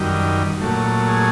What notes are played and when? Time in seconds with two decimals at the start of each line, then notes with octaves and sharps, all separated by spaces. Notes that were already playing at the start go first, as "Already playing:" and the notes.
Already playing: F#2 D#3 G3
0.61 A#2 F#3 A3
1.08 G#4